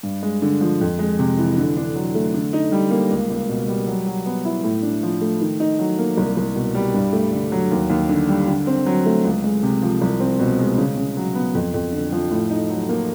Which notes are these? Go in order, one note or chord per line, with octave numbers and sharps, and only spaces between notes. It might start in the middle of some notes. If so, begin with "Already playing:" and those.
G2
G#3
D3
F3
F2
G#3
C3
E3
D3
D4
F#3
A3
D3
D#4
G3
A#3
C#2
C#2
B2
G3
F#3
F#3
B3
E4
A2
D4
F3
A3
D#3
D#4
F#3
A#3
C2
C2
B2
G3
G2
A3
D3
F#3
D#2
D#2
D3
G3
D3
C4
F#3
A3
C#2
G#3
C3
F3
C2
C4
B2
G#3
C#3
C#3
F#3
B3
F2
F2
D3
F3
A2
D#4
F#3
A#3